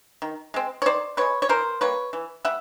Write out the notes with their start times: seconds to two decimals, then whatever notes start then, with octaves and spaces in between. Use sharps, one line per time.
0.22 D#3
0.54 G#3 C4
0.82 C#5
0.86 D#3 C5 D5
1.17 G#3 C4 B4 C#5
1.42 C#5
1.49 E3 A#4 C5
1.81 G3 A#3 B4 C#5
2.13 E3
2.45 G3 E5 F#5